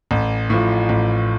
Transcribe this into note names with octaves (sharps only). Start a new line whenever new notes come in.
A1
A2 F3
A1